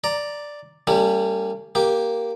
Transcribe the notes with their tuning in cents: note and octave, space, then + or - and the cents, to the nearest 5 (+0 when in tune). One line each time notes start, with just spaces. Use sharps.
D5 +0 A#5 +0
G3 +0 A#3 -45 C#4 +15
A#3 +0 G4 +0